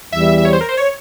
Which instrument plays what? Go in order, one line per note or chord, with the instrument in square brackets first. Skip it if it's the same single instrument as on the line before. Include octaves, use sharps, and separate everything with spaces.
[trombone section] E2 E3 G3 [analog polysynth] E5
[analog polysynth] E5
C#5
C5
A#4
C5
C#5